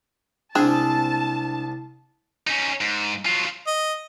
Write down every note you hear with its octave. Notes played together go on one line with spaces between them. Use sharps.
C2 G#3 C4 D4 G#4 A5
C#4 D#4
G#2
F#3 F4
D#5